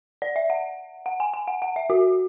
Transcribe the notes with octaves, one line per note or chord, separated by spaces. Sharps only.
D5
E5
F#5
F#5
G#5
G#5
F#5
F#5
E5
F#4